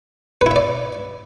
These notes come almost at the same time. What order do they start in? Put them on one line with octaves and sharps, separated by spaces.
B4 E4 E5 D5